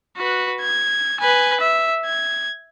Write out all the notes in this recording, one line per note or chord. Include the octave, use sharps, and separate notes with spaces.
F#4 B4
G#6
B4 G#5
E5
G#6